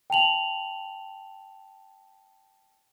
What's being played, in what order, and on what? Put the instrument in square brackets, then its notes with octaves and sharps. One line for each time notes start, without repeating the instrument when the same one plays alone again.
[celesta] G5 A5 F7 F#7